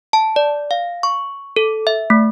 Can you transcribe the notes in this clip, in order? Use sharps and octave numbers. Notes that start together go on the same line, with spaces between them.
A5
D5
F5
C#6
A4
E5
A3